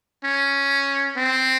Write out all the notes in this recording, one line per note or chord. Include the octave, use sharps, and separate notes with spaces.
C#4
C4